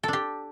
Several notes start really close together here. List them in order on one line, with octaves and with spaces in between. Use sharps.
A4 D4 G4